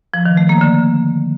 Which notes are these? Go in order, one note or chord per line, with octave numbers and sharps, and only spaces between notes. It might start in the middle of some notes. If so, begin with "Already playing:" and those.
F3
D#3
A3
A#3
D3